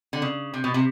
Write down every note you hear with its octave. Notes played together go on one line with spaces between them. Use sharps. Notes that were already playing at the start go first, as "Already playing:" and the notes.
D3
C#3
C3
B2
C3